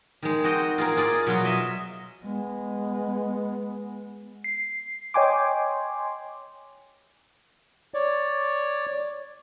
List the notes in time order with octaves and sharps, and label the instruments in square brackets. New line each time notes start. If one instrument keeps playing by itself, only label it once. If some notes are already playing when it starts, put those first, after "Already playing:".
[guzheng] D#3 G#3
C4 F#4 D#5 G5
F4 G#4 A#4
F4 G#4 D5
B2 F#3 F4
D#5 E5
[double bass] G#3 B3
[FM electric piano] C7
C#5 D#5 G5 G#5 C6 D6
[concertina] C#5 D5